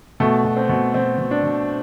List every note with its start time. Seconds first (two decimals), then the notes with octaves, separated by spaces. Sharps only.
0.20 B2 A3
0.44 B2
0.57 C4
0.69 B2
0.94 B2 C4
1.18 B2
1.31 D4
1.44 B2